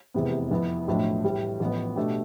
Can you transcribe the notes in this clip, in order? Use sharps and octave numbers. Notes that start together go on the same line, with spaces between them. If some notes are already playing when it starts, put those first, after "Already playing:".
F1 E2 C3 E3 B3
F2 E3 B3
B1 A2 F3 A3 D4
A2 E3 G3
A1 A2 F3 B3
B2 A3 D4 G4